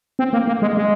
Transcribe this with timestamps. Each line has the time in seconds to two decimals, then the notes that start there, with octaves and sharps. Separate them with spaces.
0.19 C4
0.33 A#3
0.47 A#3
0.62 G#3
0.77 G#3